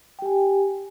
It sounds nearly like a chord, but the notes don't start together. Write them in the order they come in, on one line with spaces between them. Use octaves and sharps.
G5 G4 G#5